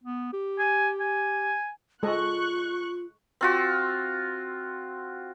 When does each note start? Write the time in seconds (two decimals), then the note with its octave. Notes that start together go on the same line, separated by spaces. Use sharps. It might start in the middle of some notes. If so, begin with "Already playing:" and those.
0.04 B3
0.33 G4
0.59 G#5
1.00 G#5
2.03 G#3 F4 A4 D#5 C#6 F#6
3.41 C4 F4 F#4